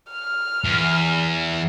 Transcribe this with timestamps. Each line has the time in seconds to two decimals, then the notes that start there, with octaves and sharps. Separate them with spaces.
0.11 F6
0.65 E2